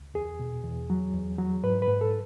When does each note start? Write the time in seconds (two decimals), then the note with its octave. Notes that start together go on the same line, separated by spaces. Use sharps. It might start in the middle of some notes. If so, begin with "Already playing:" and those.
Already playing: C#2
0.14 E2 G#4
0.39 B2
0.64 E2
0.90 F#3
1.14 E2
1.38 F#3
1.64 G#2 B4
1.82 B4
1.88 G#2
2.01 A4